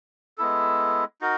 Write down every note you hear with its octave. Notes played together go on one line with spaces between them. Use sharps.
G#3 B3 E4 A4
D#4 F#4 A#4